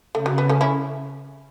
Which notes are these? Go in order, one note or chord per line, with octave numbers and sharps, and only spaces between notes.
C#3 A3
F#3
B3
A3 C#4
C#4 E4